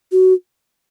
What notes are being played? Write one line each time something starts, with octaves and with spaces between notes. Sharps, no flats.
F#4